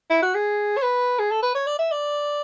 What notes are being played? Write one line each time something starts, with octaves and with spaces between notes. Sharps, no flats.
E4
F#4
G#4
C#5
B4
G#4
A4
B4
C#5
D5
E5
D5